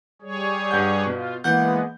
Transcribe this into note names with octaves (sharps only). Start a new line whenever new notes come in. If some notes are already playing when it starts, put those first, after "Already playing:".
G3 G#4 C#5
G2 F#5 G6
B2 F4
E3 G#3 A#3 B3 F#5 G6